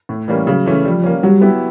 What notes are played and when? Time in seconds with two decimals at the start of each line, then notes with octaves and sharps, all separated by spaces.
0.09 A2
0.28 E3 G3 A#3 C#4
0.47 C#3 F#3
0.66 E3 A3 C#4
0.85 F3 G3
1.04 A#3 C#4
1.23 F#3 G3
1.41 B3 E4 G4